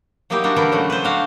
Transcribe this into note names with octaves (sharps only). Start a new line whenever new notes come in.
F#3 A#3 D#4 E4 G4
G3 D4 F#4
D3 E3 A3 E4 A#4
C#3 F#3 A3
B4 C5
D4 F#4 F5